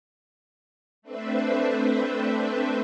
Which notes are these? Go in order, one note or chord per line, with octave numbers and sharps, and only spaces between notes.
A3 C4 D4 B4 C5 E5